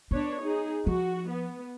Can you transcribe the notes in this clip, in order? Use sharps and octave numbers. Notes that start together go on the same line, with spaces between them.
B3 D4 B4 C#5
D#4 G#4
F3 F#4
B3